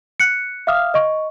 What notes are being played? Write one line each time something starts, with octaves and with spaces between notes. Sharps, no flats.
F#6 C#7
E5 F5 D6 D#6 F6
D#5 C#6